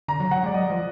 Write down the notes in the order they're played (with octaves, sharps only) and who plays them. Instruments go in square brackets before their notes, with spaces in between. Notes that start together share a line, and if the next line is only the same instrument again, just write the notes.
[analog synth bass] D3 [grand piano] A#5
[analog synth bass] F#3
[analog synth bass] F#3 [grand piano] F#5
[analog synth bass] G#3 [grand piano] D5
[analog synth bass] F#3 [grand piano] D#5
[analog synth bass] F3